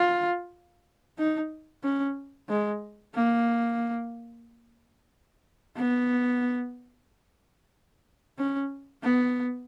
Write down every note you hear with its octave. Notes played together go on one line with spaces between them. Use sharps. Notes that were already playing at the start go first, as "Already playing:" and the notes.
Already playing: F4
D#4
C#4
G#3
A#3
B3
C#4
B3